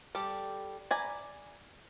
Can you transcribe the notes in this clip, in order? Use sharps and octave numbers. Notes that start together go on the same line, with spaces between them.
G3 G4 A4
D5 G#5 A#5 B5